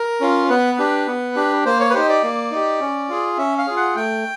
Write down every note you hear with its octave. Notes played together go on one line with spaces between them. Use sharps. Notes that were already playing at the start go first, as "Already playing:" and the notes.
Already playing: A#4
C#4 F4
B3 B4
D4 G4
B3
D4 G4
A#3 C5
C#5
B4
D#4 G4 C5
D5
A#3
D#4 G4
C#4
F4 G#4
C#4 E5
F5
F4 G#4
F#5
A3 G5